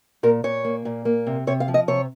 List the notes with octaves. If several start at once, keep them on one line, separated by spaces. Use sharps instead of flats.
A#2 A#4
A#2 C#5
A#3
A#2
A#3
C3
C3 C#5
F5
F3
D#5
C3 C#5